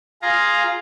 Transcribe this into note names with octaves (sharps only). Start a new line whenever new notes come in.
F4 G#4 F5 A#5